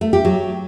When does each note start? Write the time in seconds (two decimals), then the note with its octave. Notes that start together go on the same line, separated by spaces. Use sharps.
0.01 A3
0.13 G4
0.25 F#3